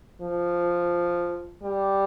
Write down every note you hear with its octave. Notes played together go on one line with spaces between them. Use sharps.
F3
G3